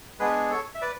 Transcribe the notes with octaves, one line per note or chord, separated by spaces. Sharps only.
G#3 B3 D4 G#4 B4
A4 C#5
E5
B4 D5